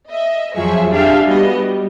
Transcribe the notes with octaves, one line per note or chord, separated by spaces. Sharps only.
D#5 E5
F2 F3 F#3 G#4 E5 C#6
D4 G4 G#4 E5 F5 G5
G3 B3 F#4 B4 D#5
G3